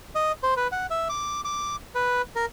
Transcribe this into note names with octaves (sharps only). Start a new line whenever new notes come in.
D#5
C5
B4
F#5
E5
D6
D6
B4
A#4